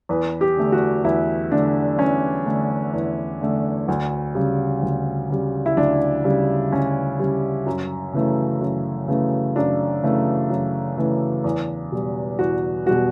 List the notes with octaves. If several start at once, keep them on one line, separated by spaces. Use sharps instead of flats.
E2 B4
G4
D3 A3
F#4
E2 E4
D3 A3 D4
E2 C#4
D3 A3
E2
D3 A3
D2
C#3 G3
D2
C#3 G3
E4
D2 D4
C#3 G3
D2 C#4
C#3 G3
F#2
C#3 E3 A3
F#2
C#3 E3 A3
F#2 D4
C#3 E3 A3
F#2
C#3 E3 A3
E2
B2 G3
E2 F#4
B2 G3 F#4